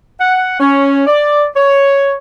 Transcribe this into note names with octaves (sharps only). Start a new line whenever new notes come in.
F#5
C#4
D5
C#5